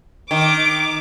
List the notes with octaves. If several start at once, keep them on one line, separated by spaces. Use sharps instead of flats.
D#3 D6